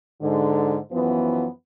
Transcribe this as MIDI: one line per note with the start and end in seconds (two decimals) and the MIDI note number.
0.21 0.77 44
0.21 0.77 50
0.92 1.47 42
0.92 1.47 52
0.92 1.47 53
0.92 1.47 59